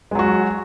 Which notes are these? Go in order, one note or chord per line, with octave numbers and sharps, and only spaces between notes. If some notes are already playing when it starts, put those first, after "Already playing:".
F#3 G#3 F#4